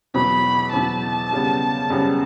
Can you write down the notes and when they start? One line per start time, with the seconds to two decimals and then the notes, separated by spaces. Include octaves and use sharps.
0.14 E2 B2 F#3 B5
0.73 E2 B2 F#3 A5
1.32 F#2 C#3 G3 B3
1.90 F#2 C#3 G3 B3